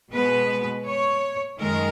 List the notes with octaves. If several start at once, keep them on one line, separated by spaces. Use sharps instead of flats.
B2 G#3 B3 B4
C#5
F#2 D#3 G#3 A#4